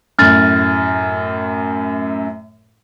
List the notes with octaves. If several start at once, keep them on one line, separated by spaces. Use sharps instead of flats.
F#2 A2 F6 A6